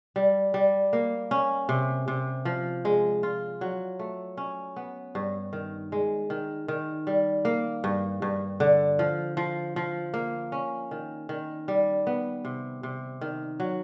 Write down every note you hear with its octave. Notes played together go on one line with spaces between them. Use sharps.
G3
G3
A#3
C#4
C3
C3
F3
G#3
F4
F#3
A3
C#4
B3
G2
D#3
G#3
D#3
D#3
G3
A#3
G2
G2
D3
F3
F3
F3
A#3
C#4
D#3
D#3
G3
B3
C3
C3
D#3
F#3